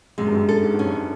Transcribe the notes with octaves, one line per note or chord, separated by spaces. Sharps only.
F#2 G#3
G2
F#2
A4
G#2
G2 C#4
F#2